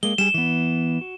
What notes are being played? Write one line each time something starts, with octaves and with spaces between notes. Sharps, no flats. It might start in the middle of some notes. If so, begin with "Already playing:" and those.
G#3 A#3 G7
G3 G#4 E7
E3 B3
F#4